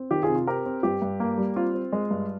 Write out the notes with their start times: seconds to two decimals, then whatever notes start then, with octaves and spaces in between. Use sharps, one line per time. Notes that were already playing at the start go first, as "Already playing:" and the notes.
Already playing: C4
0.11 D#3 G4
0.23 F4 G#4
0.29 C3
0.35 F4
0.47 C4 G4 A#4
0.66 C4
0.83 G2 G4
1.02 G2
1.20 A#3
1.38 G3
1.56 C4 F4
1.74 C4
1.93 G#3
2.11 G2